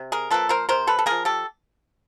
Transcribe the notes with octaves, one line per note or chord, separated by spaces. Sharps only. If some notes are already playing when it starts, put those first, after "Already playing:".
Already playing: C3
G#4 A#4
F3 A#3 A4 B4
A#4 C5
C3 A#4 C5
A4 B4
A4
F3 A#3 G#4 A#4
G4 A4